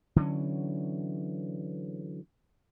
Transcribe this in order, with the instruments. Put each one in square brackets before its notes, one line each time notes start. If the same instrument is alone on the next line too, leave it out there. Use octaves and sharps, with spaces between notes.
[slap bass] D3 E3 F#3 C#4